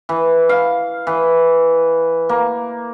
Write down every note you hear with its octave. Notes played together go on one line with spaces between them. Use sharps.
E3
F5
E3
A#3